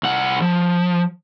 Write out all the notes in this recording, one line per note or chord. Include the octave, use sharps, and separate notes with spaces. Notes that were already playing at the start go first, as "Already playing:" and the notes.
C2 F#5
F3